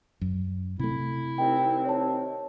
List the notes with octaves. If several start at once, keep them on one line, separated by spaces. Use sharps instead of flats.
F#2
C3 A3 E4
C2 D#3 C4 G5
C#5 A5